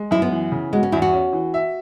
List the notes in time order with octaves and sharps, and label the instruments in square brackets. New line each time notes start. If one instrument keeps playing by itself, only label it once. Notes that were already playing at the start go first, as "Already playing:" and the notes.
Already playing: [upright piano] G#3
[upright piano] F#2 [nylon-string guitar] E4
[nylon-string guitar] B3
[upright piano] E3
C#3
[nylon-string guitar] G#3 [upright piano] F#4
[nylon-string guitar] C#4
[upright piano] E2 [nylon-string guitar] E4
[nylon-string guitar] F#4
[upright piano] C#4
E3
E5